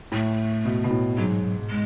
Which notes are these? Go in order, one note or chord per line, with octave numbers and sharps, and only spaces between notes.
A2 A3
B2
B2
A2
G#2 F#3
G#3